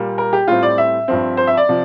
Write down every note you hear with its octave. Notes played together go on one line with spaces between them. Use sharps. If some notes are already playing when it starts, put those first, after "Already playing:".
Already playing: A#2 G3 A#3
A#4
G4
A2 G3 C4 F4
D5
E5
G2 F3 C4
C5
E5
D5
C3 F3